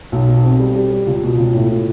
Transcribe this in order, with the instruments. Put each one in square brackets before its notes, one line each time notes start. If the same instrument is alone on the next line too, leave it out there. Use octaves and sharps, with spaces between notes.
[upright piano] B1
B2
C4
G3
G3
G3
C#2
B2
C#2
A2
A2